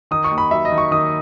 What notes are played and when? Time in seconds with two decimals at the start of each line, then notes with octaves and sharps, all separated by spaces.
0.11 D#3 D#6
0.24 C#6
0.31 D#2
0.38 B5
0.51 F#3 E5
0.65 D#5
0.72 D#3
0.78 C#6
0.91 D#3 D#6